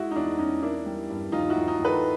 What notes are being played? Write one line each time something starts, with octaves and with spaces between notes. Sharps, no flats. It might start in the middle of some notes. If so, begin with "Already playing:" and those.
Already playing: G#3 E4 F#4
D#4
E2 D4 E4
E2 C#4 D#4
A#3 D4 E4
G3
G2
D#2 D#4 F4
E4 F#4
D#2
D#4 F4
D#2
A4 B4